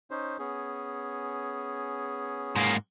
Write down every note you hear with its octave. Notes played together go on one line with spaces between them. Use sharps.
C#4 D#4 C5
B3 C#4 G#4
G#2 A#3